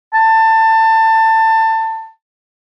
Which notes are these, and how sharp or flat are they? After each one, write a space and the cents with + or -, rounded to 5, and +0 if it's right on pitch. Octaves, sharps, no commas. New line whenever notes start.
A5 +20